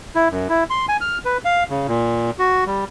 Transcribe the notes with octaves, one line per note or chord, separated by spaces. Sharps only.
E4
F#2
E4
C6
G#5
F6
B4
F5
C#3
A#2
F#4
G3